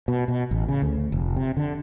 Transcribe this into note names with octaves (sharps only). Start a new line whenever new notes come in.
B2
B2
A1
C#3
D2
F1
C3
D3